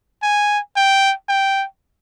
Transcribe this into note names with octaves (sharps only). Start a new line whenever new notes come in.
G#5
G5
G5